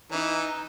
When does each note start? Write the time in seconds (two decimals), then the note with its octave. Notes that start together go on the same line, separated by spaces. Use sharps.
0.11 E3 D#4